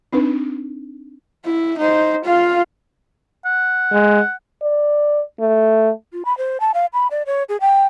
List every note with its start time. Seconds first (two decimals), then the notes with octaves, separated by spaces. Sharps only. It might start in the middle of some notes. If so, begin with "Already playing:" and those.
0.12 C4 D4 D#4 B4
1.45 E4
1.78 D#4 C5
2.24 F4 F5
3.45 F#5
3.93 G#3
4.62 D5
5.40 A3
6.12 F4
6.25 B5
6.38 C5
6.60 A5
6.74 F5
6.93 B5
7.11 D5
7.26 C#5
7.49 G#4
7.61 G5